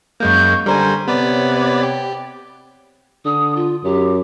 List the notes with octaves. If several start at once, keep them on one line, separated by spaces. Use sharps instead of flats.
F#2 G#3 A#3 C#6 G6
D3 G3 A#4 C5 G#5
C3 B3 B4 C#5 D5
G4
D3 D#6
F4
F#2 G4